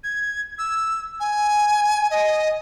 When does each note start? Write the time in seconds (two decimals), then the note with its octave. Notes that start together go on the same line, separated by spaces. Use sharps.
0.04 G#6
0.58 E6
1.20 G#5
2.11 D#5